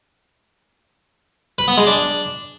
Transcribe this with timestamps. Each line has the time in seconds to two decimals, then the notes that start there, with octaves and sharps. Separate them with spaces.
1.58 B4
1.68 B3
1.77 G#3
1.87 D4